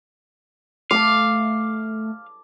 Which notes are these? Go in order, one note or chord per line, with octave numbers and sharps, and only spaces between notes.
A3 F5 A5 D6